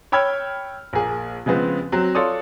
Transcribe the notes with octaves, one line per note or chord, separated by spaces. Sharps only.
C#5 G5 B5 E6 F6 G#6
A#1 A#3 G#4
C#3 F3 G#3 B3 C4
F#3 C4
F4 A4 C#5 D5 C6 D#6